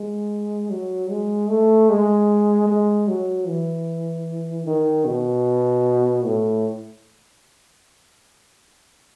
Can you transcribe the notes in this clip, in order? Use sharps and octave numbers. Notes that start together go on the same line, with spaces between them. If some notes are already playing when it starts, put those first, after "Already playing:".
Already playing: G#3
F#3
G#3
A3
G#3
G#3
F#3
E3
D#3
B2
A2